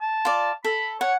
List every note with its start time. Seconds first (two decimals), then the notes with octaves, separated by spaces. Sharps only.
0.02 A5
0.25 F4 D5
0.64 A4 B5
1.01 C#5 F#5